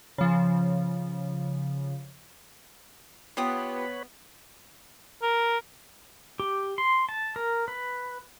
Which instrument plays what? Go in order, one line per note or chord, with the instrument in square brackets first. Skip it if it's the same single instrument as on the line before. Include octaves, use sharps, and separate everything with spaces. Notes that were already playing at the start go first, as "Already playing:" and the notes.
[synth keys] C#3 F3
[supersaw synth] B3 [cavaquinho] F4 G4 D#6 [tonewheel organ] B4 C#5 B5
[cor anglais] A#4
[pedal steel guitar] G4
C6
A5
A#4
B4